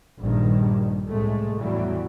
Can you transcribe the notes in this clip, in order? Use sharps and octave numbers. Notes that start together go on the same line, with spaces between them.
A#1 G2 D#3
C2 A2 G#3 A3
E2 A2 E3 F#3 G3